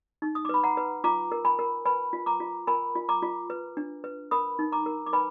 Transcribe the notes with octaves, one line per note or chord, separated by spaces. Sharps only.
D#4
D#6
D6
B4 B5
F#5 A#5
B4
F4 A#5 D6
A#4
G#5 B5
A#4
B4 G#5 B5
F4
A#5 D6
F4
A#4 G#5 B5
F4
A#5 D6
F4
B4
D4
B4
A#4 B5 D#6
D#4
A#5 D6
A#4
D6
B4 G#5 B5